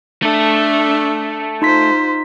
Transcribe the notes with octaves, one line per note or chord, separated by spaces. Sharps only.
A3 D4 A4 E5
D#4 F4 C5 C6 B6